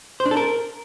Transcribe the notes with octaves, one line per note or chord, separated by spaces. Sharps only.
C5
D4
A4
A#4